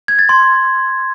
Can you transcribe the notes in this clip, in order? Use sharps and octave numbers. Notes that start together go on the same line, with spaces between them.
G#6
A6
C6